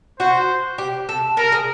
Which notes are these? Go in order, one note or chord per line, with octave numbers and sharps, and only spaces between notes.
F#4 C5
G4
A4
A4 A#4
G#4